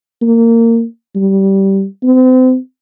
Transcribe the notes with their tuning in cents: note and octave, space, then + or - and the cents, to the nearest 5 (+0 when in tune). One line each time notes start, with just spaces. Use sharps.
A#3 -20
G3 -15
C4 -35